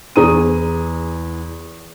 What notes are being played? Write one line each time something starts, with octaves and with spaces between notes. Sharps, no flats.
E2 G#4 A#5 D#6 D#7